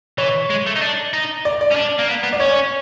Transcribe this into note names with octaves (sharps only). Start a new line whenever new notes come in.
E3 C#5
G#3
A3
D#4
D4
D#4
D5
D5
C#4
D4
A#3
B3
B3
D5
C#4 C#5